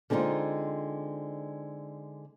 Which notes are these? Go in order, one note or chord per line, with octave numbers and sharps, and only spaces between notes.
D3 G#3 C4 C#4 D#4 F4